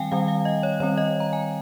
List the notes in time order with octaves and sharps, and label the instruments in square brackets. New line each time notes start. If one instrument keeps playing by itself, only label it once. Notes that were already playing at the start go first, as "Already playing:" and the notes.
Already playing: [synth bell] D#3 G3 C4 F5 G5 G#5
D#3 G3 C4 F5
F5
D#5
C#5
D#3 G3 C4 C#5
D#5
A#5
G#5